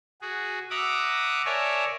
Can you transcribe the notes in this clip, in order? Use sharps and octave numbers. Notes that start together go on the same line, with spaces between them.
F#4 G#4
E5 F#5 A#5 D6 D#6
A#4 C#5 D5 E5 G#5 A5